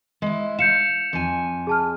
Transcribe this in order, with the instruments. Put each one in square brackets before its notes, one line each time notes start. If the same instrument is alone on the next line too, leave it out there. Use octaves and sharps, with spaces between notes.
[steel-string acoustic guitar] G#3 E4
[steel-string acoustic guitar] F5 [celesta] G6 C#7 E7
[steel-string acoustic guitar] F2 G#5
[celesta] G#4 A5 F6